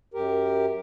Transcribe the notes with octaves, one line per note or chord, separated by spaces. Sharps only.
F#2 G4 A#4